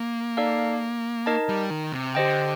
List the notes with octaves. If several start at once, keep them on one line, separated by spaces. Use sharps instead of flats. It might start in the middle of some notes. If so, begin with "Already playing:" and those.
Already playing: A#3
D#4 A4 D5 F5 A5
D#4 A#4 D#5 A5
G3
D#3
C3
D3 G4 C5 D#5 G5